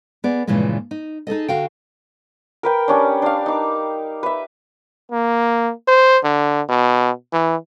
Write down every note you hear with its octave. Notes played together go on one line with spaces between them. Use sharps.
B3 G#4 D5
G2 A#2 C#3 E3 F3 G#3
D#4
D#4 G#4 A4 D#5
D3 F#4 F5 G5
A#4 B4 G5
G3 C#4 D4
D4 F5
D#4 D6
B4 E5
A#3
C5
D3
B2
E3